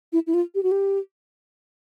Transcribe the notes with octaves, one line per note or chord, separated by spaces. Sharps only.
E4
E4
F4
G4
F#4
G4